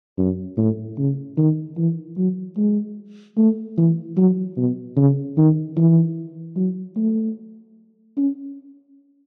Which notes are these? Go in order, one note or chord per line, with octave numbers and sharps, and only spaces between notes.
F#2
A2
C#3
D#3
E3
F#3
G#3
A3
E3
F#3
B2
C#3
D#3
E3
F#3
A3
C#4